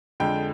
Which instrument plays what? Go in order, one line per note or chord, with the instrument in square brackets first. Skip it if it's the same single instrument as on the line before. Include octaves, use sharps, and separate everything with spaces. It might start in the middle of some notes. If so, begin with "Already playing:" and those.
[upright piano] F2 D3 G#3 G5